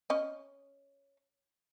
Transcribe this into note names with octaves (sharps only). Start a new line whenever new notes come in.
C#4 D#5